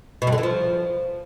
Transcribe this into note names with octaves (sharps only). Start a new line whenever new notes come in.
B2
G2
D3
E3
F3